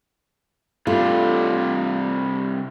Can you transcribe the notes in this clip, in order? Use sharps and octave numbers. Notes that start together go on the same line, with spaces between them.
C3 G3 A3 D4 F4